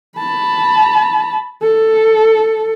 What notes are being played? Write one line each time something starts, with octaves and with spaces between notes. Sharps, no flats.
A5 B5
A4